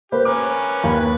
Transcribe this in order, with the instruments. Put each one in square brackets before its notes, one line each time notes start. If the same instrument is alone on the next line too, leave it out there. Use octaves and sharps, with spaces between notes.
[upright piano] A#3 B4 C5 [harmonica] G4
[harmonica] C#4 A#4 B4 [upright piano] D6
[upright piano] D#2 B5
[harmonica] B4